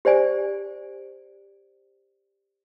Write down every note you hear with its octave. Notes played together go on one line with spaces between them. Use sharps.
G4 C5 D5 G#5